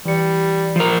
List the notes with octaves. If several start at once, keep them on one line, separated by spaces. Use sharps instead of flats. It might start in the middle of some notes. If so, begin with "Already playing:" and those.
E3 G3 C#7
F3 A#4